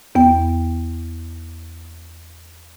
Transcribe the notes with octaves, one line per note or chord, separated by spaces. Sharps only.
E2 B3 G5